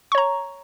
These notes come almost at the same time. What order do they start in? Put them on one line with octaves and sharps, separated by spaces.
C#6 C#5 A#5